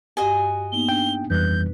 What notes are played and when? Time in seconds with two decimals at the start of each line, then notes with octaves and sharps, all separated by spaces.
0.17 G2 F#4 G4 D#5 G#5
0.72 A#3 B3 D#4 G7
0.89 D4 G5
1.30 F2 E3 G3 B4 F#6 G6